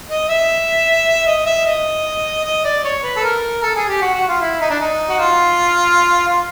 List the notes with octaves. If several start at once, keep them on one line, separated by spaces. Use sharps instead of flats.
D#5
E5
D#5
E5
D#5
D#5
D5
C#5
B4
A4
A#4
A4
G#4
G4
F#4
F#4
F4
E4
D#4
D4
D#4
F#4
F4
F4